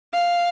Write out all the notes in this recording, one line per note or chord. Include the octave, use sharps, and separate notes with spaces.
F5